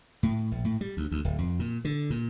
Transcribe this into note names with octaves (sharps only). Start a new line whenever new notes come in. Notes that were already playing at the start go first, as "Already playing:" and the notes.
A2
A#1
A2
G3
D2
D2
D1
F2
A#2
D3
A#2